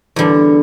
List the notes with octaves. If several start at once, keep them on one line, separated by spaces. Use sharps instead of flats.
E2 D3 G3